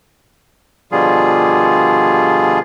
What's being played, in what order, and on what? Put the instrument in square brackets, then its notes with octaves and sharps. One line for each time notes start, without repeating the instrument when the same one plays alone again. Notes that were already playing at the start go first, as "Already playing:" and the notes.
[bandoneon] B2 D3 F3 G3 F4 G#4